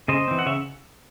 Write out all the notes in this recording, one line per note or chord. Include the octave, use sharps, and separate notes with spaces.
C#3 C5 D#5
E3 C4
F#5
C#3 C#5 E5